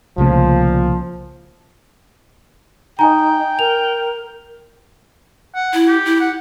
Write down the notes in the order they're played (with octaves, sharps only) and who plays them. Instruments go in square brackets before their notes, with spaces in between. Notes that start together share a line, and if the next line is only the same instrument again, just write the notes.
[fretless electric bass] C2 C#3 A3 [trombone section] A#2 F3
[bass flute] D#4 [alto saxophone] G5 [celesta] G#5 A#5
[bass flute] A#4 [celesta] F7
[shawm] F#5
[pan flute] E4
[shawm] G4
[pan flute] E4
[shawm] F#5